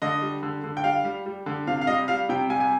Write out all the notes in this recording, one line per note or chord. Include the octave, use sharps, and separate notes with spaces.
D3 D#5
G3
D3
D3
G5
G3 F5
G3
G3
D3
C3 F5
F5
G3 D#5
G3 F5
C3 G5
G3 G#5
G#5